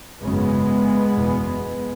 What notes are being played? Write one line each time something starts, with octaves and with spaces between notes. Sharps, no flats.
G#1 F#2 C#3 G#3 B3
F#1 E2 B2